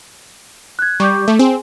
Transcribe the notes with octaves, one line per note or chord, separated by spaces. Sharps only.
F#6 G#6
G3 C#6 D6 G6
A3
C4 G#4 G#5